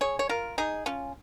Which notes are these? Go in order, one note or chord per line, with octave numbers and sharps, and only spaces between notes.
G#4 C#5
C#5
F4 A#4
D#4 G#4
C#4 F4